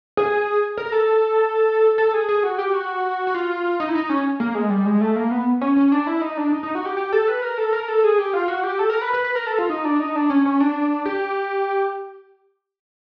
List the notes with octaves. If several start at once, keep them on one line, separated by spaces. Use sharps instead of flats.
G#4
A#4
A4
A4
G#4
G#4
F#4
G4
F#4
F#4
F4
D#4
E4
D#4
C#4
A#3
G#3
G3
G#3
A3
A#3
B3
C#4
C#4
D4
E4
D#4
D4
D#4
D#4
F#4
G4
G4
A4
B4
A#4
A4
A#4
A4
G#4
G4
F4
F#4
G4
A4
A#4
B4
B4
B4
A#4
A4
F4
D#4
D4
D#4
D4
C#4
C#4
D4
G4